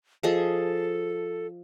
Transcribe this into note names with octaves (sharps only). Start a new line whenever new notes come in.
F3 G#4 A4 D#5